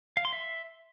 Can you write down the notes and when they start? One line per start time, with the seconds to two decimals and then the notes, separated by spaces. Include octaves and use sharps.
0.17 F5
0.25 C6
0.33 E5